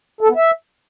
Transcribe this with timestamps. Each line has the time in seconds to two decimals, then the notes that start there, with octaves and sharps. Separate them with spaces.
0.21 A4
0.28 B3
0.36 E5